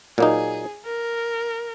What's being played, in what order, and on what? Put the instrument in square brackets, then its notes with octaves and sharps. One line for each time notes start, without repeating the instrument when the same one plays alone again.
[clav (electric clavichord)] A#2 F#3 A#3 D#4 [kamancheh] G#4
[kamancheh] A#4